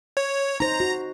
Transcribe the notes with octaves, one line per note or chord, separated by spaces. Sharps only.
C#5
D#4 C5 A#5 A#6
F#4